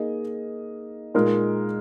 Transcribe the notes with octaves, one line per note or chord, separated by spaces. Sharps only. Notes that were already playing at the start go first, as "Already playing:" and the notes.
Already playing: A#3 D#4 G#4 D#5
A#2 G#3 D#4 A#4